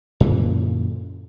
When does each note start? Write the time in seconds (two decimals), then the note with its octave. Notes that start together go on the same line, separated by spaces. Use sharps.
0.20 F#2 A#2 D3 E3